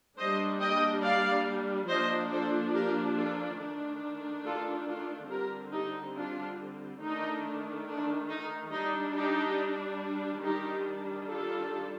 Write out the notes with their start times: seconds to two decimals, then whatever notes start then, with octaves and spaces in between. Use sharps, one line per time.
0.18 G3 A#3 D4 C5 D#5
0.61 D#5 G5
1.03 D5 F5
1.88 F3 A#3 D4 C5 D#5
2.31 A4 C5
2.74 G4 A#4
3.16 F4 A4
3.59 D#3 A3 D4
4.45 F4 A4
4.87 F4 A4
5.30 D3 G3 C4 G4 A#4
5.72 D#4 G4
6.16 D4 F4
7.01 D#3 A3 D4 D#4
7.87 D4
8.30 D#4
8.72 G3 D4 D#4
9.15 D#4 G4
10.43 D#3 G3 D4 D#4 G4
11.29 F4 A4